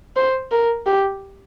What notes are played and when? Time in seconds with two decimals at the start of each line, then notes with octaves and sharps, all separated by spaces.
0.16 C5
0.51 A#4
0.86 G4